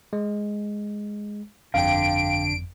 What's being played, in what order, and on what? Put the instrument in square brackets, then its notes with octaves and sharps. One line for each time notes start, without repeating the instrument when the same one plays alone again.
[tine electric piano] G#3
[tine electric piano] G1 F2 [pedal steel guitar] D3 [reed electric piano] F5 G5 [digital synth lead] D7